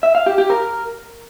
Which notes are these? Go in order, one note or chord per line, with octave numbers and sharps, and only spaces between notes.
E5
F5
G4
G4
A#4